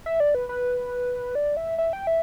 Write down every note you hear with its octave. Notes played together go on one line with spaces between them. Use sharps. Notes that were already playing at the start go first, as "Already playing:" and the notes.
E5
D5
B4
B4
D5
E5
E5
G5
E5